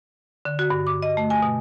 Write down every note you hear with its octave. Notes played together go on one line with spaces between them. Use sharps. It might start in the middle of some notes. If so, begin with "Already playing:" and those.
D3
F#4
G2
D6
D#5
A3
G#5
B2